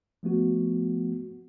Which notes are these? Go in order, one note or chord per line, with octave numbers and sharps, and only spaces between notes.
F3 A3 B3 F#4